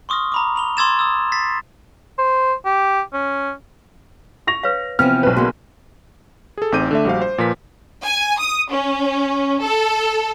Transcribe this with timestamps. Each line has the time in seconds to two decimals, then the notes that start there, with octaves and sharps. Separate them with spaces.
0.09 C6 C#6 D#6 F6 A#6
0.32 A#5 B5 D6
0.56 B5 F7 G7
0.77 C6 D6 E6 G#6 A6 E7
0.99 D#6 E6
1.32 A6 B6 C7
2.19 C5
2.65 G4
3.13 C#4
4.47 C#6 A#6 F7
4.63 B4 C#5 F5
4.99 C3 E3 F3 B3 F5 F6
5.23 B1 B4 B5
5.37 C#3 A#3 B3 F#4
6.58 G#4 A4
6.72 A1 C4 D#4 D6 G6 D#7
6.91 D3 A3 E5
7.05 A#1 G3 F#4 C5 F5
7.22 C5
7.38 A#2 F3 A#4 B4 B6
8.05 G#5
8.39 D#6
8.71 C#4
9.62 A4